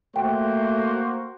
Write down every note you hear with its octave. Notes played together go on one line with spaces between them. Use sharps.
A3 A#3 F#4 C5 G5